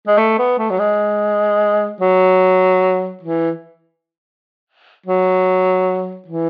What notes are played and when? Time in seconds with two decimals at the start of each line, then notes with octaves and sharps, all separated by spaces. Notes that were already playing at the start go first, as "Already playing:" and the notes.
0.07 G#3
0.18 A3
0.38 B3
0.58 A3
0.70 F#3
0.79 G#3
2.01 F#3
3.23 E3
5.06 F#3
6.28 E3